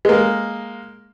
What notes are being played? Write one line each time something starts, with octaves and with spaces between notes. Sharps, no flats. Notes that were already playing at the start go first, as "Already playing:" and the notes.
G#3 A#3